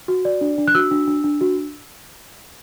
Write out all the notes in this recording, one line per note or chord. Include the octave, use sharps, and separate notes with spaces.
F#4
D5
D4
D4
F#6
F#4 E6
D4
D4
D4
F#4